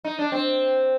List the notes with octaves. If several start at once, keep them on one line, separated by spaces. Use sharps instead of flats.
D#4
D4
C4